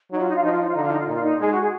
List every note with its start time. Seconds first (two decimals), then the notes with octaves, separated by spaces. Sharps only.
0.11 F#3 D#4
0.19 F4
0.27 D#4
0.36 F4
0.42 F3 D#4
0.50 F4
0.59 D#4
0.67 F4
0.74 D3 D#4
0.83 F4
0.90 D#4
0.99 F4
1.07 A#2 D#4
1.14 F4
1.23 D#4
1.40 G#3 G#4
1.51 F#4
1.61 G#4